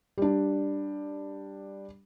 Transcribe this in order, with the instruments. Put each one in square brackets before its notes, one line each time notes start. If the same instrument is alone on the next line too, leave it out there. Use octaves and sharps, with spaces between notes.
[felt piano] G3 D4